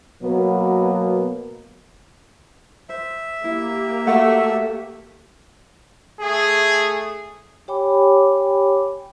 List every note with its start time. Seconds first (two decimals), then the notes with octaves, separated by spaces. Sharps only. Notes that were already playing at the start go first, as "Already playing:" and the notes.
0.22 B2 F#3 A#3 B3
2.89 C5 E5
3.44 A#3 E4 G4
4.07 A3 F#4 F5 F#5
6.20 A3 G#4
7.68 G4 C#5 G5 G#5 B5 D6